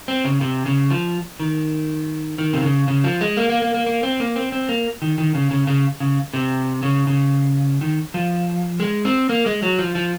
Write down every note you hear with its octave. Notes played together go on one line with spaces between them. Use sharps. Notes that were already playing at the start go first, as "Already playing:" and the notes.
C4
C#3
C3
C#3
F3
D#3
D#3
C3
C#3
C#3
F3
G#3
A#3
A#3
A#3
A#3
A#3
C4
A#3
C4
C4
A#3
D#3
D#3
C#3
C#3
C#3
C#3
C3
C#3
C#3
D#3
F3
G#3
C4
A#3
G#3
F#3
F3
F3